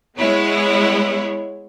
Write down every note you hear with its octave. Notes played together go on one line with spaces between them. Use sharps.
G#3 B3 E4 C#5